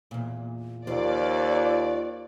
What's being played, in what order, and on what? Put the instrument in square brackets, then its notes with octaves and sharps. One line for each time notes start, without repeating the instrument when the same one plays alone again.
[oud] E2 A#2
[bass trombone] D#2 [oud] F3 [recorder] F4 [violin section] D5